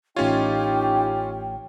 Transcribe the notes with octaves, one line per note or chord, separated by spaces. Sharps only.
A1 A3 C#4 D#4 F4 G4 C#5 G5